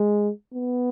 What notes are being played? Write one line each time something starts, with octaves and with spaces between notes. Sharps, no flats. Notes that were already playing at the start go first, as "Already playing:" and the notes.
Already playing: G#3
B3